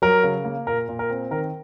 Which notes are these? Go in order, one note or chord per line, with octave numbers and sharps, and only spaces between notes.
F#3 A#4
C#3
A#3
A#2 A#4
A#2
A#4
C4
D#3 A#4